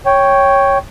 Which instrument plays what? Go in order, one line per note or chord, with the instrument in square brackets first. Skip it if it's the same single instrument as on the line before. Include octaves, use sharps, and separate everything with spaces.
[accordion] C#5 G5